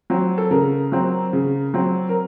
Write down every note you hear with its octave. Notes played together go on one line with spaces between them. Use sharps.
F#3 C4
A4
C#3 A#4
F#3 C4
C#3
F#3 C4
A#4